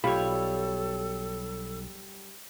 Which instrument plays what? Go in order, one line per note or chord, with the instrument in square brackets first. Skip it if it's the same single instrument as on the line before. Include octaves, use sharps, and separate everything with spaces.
[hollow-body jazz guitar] B1 F4 B5 [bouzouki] G3 C#5 [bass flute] A4